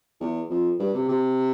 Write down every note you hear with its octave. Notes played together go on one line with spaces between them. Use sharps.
E2
F2
G2
C3
C3